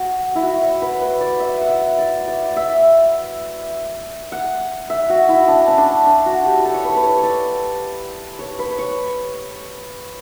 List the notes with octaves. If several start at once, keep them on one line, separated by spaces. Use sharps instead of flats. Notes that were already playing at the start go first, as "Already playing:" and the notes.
Already playing: F#4
E4
F#4
C#5
B4
B4
D5
E5
F#5
E5
D5
D5
E5
F#5
E5
F#4
E4
D4
C#4
D4
D4
F#4
G4
A4
C#5
B4
B4
C#5
C#5
D5
C#5
B4
C#5